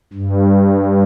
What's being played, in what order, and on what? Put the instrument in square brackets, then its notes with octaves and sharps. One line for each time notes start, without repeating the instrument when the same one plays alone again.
[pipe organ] G2